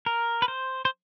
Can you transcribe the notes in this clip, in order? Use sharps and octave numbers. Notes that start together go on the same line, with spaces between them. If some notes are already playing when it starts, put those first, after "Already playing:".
A#4
B4
C5
C5